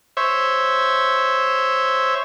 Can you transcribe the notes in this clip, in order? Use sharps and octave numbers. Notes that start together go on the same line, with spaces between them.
C5 C#5 E5